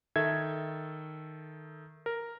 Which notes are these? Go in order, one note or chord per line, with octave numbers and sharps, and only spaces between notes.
D#3 A4 E5 G#6
A#4